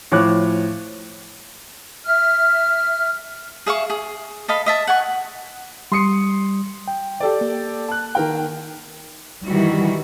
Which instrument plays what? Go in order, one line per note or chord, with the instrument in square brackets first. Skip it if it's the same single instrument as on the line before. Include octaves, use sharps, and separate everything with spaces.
[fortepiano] A2 F3 C#5 D6 F#6
[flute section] E5 F6
[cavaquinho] G#4 E5 F5 C#6
G#4
A4 D#5 F5 B5
D#5 E5 A5
F#5 G#5 C#6
[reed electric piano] G3 D#6 [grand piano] C6 C7 C#7
[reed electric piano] G5
[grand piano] G4 A4 D5
[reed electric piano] A#3
[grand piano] A5 F#6
D#3 A#4 G5
[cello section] D#3 E3 F#4 [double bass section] G3